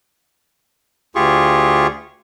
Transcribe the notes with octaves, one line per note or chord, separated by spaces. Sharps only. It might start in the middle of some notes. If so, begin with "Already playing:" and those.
D2 F4 G4 G#4 C#6